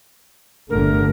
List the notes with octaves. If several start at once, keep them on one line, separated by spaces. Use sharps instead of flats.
G1 D3 A3 A#4